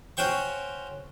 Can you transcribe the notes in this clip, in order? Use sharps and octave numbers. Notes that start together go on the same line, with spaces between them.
C#4 F#4 C5 G5 C#6